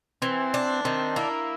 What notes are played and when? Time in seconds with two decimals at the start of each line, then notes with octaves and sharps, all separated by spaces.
0.22 E3 C4
0.54 D4
0.85 D#3 C4
1.16 A#3 E4